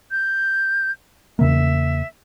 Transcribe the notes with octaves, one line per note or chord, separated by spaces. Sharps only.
G6
E2 C#3 A#3 E5